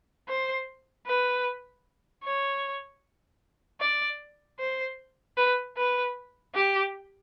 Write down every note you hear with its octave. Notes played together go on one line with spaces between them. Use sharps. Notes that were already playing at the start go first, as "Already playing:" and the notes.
C5
B4
C#5
D5
C5
B4
B4
G4